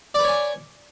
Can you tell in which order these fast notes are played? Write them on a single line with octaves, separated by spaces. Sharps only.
D5 B4 C#5 G#5